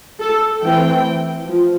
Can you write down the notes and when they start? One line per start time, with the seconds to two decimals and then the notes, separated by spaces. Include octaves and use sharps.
0.20 A4
0.63 E3 A3 C4 G5
1.47 F3